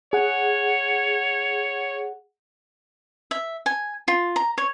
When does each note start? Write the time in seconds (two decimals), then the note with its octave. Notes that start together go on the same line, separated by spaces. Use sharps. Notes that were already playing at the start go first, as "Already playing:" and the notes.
0.13 G#4 C#5 F#5
3.31 E5
3.66 G#5
4.08 F4
4.36 A#5
4.58 C#5